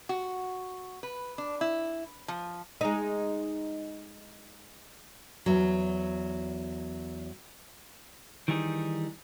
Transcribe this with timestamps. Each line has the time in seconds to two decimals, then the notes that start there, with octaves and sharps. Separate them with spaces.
0.09 F#4
1.03 B4
1.38 D4
1.61 E4
2.28 F3
2.81 G#3 D#4
5.46 E2 F#3
8.48 D#3 E3 G3 D#4 E4 G#4